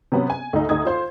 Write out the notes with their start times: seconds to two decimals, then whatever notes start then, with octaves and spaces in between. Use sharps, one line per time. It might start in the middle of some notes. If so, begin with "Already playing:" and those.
0.12 C3 F#3 B3 C#4
0.30 G#5
0.53 D2 D#4
0.69 D2 D#4 D#6 G#6
0.85 F4 C5 C6